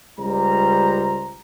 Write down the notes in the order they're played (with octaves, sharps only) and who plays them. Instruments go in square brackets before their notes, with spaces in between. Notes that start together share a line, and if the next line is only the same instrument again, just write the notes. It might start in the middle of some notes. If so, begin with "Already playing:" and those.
[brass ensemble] C#2 G3 C5 A#5